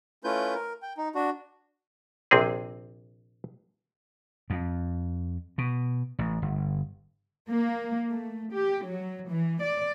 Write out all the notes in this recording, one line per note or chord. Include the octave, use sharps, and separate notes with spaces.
A3 C#4 E4 F4 B4 G6
A#4
G5
D#4
D4 F#4
A#1 C3 C4 G#4
F2
B2
A1
G1
A#3
A3
G4
F#3
E3
D5